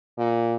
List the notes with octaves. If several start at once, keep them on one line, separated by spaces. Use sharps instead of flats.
A#2